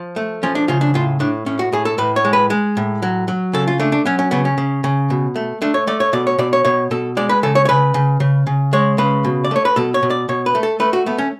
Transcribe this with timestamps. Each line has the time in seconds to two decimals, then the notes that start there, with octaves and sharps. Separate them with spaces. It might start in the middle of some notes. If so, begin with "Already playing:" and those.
Already playing: F3
0.16 A3
0.43 F3 C#4
0.55 D4
0.68 C#3 F4
0.81 D4
0.94 A2 F4
1.20 A2 D4
1.46 A2 C#4
1.59 F#4
1.73 A2 G#4
1.85 A4
1.98 A2 B4
2.16 C#5
2.24 G#3
2.33 B4
2.50 G#3
2.77 A2
3.02 F#3
3.28 F#3
3.53 C#3 A4
3.68 F4
3.80 A3 D4
3.92 D4
4.05 F#3 C#4
4.19 C#4
4.31 C#3 B3
4.45 C#4
4.58 C#3
4.84 C#3
5.10 B2
5.36 A3
5.62 A3 D4
5.74 C#5
5.87 A3 D5
6.00 C#5
6.13 B2 D5
6.27 C#5
6.39 B2 D5
6.53 C#5
6.65 B2 C#5
6.91 B2 A4
7.17 G#3 D5
7.29 B4
7.43 C#3 A4
7.55 C#5
7.65 C#5
7.69 C#3 B4
7.94 C#3
8.20 C#3
8.47 C#3
8.73 G#3 C#5
8.98 C#3 B4
9.24 B2
9.44 D5
9.51 A3 C#5
9.65 B4
9.76 B2 A4
9.94 C#5
10.03 B2
10.10 D5
10.29 B2 C#5
10.46 B4
10.55 A3
10.63 A4
10.80 A3 B4
10.93 F#4
11.06 A3 B3
11.18 C#4